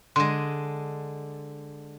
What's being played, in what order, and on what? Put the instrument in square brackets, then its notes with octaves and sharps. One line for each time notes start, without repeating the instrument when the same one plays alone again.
[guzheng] D3 G#3 [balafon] C6